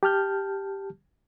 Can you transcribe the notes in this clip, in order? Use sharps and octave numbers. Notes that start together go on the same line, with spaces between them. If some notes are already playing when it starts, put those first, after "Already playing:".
G4 A5 F6 G6